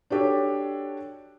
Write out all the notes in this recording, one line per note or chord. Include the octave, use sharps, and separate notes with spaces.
D4 F#4 G4 A4 C#5